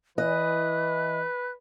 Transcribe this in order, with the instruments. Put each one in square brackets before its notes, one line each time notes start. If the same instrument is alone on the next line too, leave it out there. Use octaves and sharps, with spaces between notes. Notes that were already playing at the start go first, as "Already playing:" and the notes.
[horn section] E3 [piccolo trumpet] B4 [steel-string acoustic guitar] D#5 [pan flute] F#6